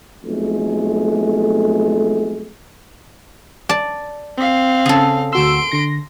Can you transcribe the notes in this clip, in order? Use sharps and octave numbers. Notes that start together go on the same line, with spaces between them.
B1 F2 G#3 A3
D5 A5
C4 F5
C#3 C#4 G#4 A4
D2 F#4 C6 E6 D7
D3 A#6